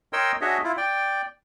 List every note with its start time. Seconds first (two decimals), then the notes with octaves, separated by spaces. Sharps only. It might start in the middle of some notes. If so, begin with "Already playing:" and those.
0.13 A#4 C#5 D#5 G5 C6 E6
0.41 D4 F#4 G#4 C#5 D#5 E5
0.64 E4 F4
0.77 D5 G5